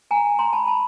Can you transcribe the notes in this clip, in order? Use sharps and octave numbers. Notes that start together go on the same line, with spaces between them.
G#5 A#5
A#5 C6
A5 B5
A5 B5